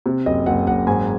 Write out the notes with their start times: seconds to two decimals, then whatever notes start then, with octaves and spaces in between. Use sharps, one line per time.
0.06 C3
0.26 F#1 D#5
0.46 F#1 F#5
0.67 F#1 F#5
0.87 G#2 G#5